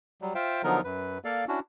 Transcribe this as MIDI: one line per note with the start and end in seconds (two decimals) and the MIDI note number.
0.21 0.33 54
0.21 0.33 55
0.35 0.62 65
0.35 0.62 72
0.35 0.62 76
0.35 0.62 77
0.35 0.62 79
0.64 0.81 50
0.64 0.81 53
0.64 0.81 54
0.64 0.81 59
0.64 0.81 63
0.64 0.81 70
0.84 1.18 42
0.84 1.18 71
1.25 1.45 58
1.25 1.45 69
1.25 1.45 74
1.25 1.45 77
1.48 1.60 61
1.48 1.60 62
1.48 1.60 64
1.48 1.60 66